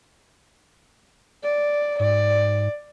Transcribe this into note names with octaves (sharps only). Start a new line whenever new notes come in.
D5
G#2 D5